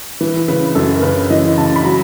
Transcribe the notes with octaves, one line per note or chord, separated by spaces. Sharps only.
E3 B4
C#3 B4
F#2 A4
A#4
C#3 B4
E3 D#5
C#3 A5
B5
F#3 A#5